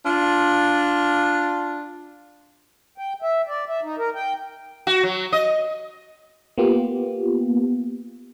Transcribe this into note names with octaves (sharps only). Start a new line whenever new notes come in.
D4 F4
G5
E5
D5
E5
D#4
A#4
G5
F#4
F#3
D#5
A#3 B3 F4 G4